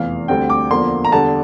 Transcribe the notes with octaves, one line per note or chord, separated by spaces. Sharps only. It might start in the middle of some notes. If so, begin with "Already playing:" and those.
Already playing: F1 E2 E3 F5
D2 D3 G3 C4 G5
D6
E2 D3 F3 A#3 C6
A#5
E2 D3 G3 A5